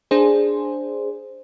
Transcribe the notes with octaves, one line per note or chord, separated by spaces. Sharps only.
D4 G#4 C5